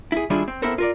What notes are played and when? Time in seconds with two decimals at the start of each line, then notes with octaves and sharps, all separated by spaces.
0.12 E4 G#4
0.30 D#3 G3 D4 E4 F4 G#4
0.48 C4
0.62 B3 C4 E4 A4 A#4 C5
0.78 F4 A#4 D5